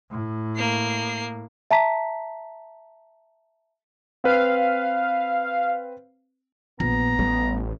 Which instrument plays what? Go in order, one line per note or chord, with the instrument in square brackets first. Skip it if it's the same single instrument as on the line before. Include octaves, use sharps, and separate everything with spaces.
[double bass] A2
[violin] A#3 C7
[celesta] E5 A5 A#5 B6
[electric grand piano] C4 B4 [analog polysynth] F5
[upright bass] A#1 [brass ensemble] B3 [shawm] A#5
[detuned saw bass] A1 [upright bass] G3